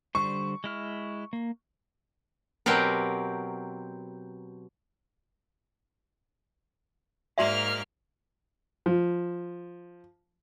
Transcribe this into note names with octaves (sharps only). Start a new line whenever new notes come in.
D3 G3 C5 C#6
G#3 E4 F6
A#3
B2 F#3 C4 G4 A#4 B4
G#2 A#3 F#4 D5 E5 F6
F3